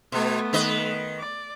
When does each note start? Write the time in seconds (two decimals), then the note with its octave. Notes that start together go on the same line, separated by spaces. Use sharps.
0.12 B2 A3 B3
0.53 D#3 B4 D#5
1.19 D5